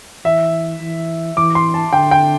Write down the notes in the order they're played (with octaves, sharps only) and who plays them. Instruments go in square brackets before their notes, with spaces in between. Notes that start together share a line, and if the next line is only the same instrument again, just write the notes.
[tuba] E3 [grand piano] E5
[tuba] E3
[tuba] E3 [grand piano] D6
[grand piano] C6
A5
[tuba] D3 [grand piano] G5
[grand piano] G5